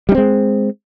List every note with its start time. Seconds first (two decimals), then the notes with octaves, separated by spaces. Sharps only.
0.09 G3
0.12 D4
0.15 C4
0.18 G#3